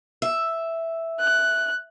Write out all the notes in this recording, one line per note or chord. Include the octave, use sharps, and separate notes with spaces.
E5
F#6